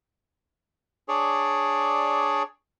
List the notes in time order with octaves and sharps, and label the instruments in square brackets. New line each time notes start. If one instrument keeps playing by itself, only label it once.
[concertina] D4 G#4 C#5 D5